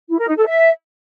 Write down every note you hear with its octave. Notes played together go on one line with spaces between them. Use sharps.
E4
A#4
D#4
A4
E5